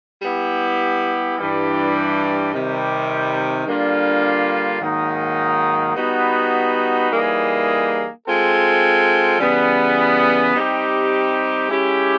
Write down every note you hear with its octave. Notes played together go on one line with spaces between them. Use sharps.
G3 B3 E4 G4
G2 E3 G3
C3 D#3 G3
D3 G3 A#3 D4 F4
G#2 D#3 F#3 A#3 D#4
G3 B3 D#4 F#4 B4
E3 G3 A#3 D#4 G#4
G#3 C4 F4 A4
C#3 E3 G3 B3
G3 C4 D#4 G4
G#3 C#4 E4 G4